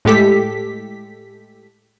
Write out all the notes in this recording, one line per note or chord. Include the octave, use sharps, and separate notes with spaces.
A2 G#3 A3 G4 A4 B6